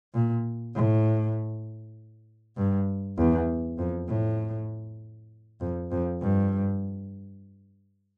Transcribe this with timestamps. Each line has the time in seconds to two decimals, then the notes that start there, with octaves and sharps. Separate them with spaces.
0.14 A#2
0.75 A2
2.57 G2
3.18 E2
3.79 F2
4.09 A2
5.61 F2
5.92 F2
6.22 G2